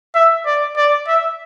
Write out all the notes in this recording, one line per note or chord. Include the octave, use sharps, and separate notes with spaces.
E5
D5
D5
E5